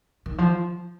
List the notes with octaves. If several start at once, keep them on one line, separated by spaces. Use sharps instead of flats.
D#3
F3